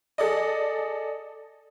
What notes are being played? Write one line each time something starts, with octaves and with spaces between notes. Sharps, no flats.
G#4 A4 D5 D#5